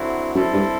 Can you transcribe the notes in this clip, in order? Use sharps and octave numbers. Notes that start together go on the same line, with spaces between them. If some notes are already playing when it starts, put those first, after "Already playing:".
Already playing: D3 F#3 C4 E4
F#2 G3 C4 E4 A4
G2